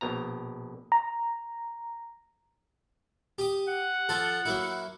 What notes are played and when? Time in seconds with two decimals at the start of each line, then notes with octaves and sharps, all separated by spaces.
0.01 A#1 B2 A#5
0.92 A#5
3.38 G4 D#6
3.69 F#5
4.09 F3 F4 A4
4.46 F#3 A#3 E4